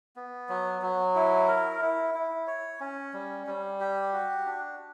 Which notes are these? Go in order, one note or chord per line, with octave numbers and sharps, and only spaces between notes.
B3
F#3
F#3
E4
A#4
E4
E4
C#5
C#4
G3
G3
G4
F#4
D4